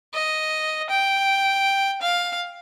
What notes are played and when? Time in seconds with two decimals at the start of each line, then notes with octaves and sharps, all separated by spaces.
0.14 D#5
0.89 G5
2.01 F5